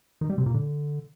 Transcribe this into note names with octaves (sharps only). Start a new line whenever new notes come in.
D#3
G3
C3
A#2
D3